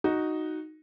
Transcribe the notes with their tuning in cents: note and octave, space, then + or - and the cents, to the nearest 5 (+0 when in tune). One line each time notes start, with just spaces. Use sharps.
D#4 +0 F#4 +0